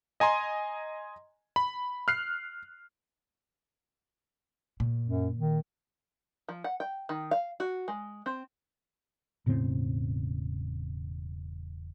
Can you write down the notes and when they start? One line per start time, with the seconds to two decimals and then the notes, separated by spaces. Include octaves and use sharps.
0.20 D#5 G#5 A#5 C6
1.56 B5
2.08 F6 F#6 C7
4.80 A#2
5.06 F#2
5.38 D#3
6.48 F3
6.64 F#5
6.80 G5
7.09 D#3
7.31 F5
7.60 F#4
7.88 G#3
8.26 C4
9.46 E1 A2 C#3 C4